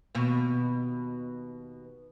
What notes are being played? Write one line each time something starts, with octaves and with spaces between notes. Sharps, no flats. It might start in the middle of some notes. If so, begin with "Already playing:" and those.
D#2 B2